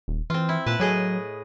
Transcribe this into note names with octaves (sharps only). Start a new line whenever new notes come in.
D#1
E3 C4 F4
E4
A#2 B4 A5
A2 F#3 G#4 D#5